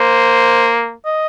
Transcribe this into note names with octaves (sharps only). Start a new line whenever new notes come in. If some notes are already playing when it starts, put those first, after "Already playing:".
Already playing: A#3 C5
D#5